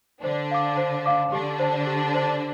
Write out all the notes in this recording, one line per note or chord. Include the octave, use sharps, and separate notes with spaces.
D3 D4 C5
F5 D6
C5
F5 D6
D3 D4 G4
C5 A5
G4
C5 A5